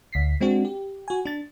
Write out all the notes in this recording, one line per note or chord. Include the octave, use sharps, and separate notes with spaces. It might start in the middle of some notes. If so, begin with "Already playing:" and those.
D2 B6 C7
G#3 C4 D4 F#4
G4
F#4 G#5
D4 A6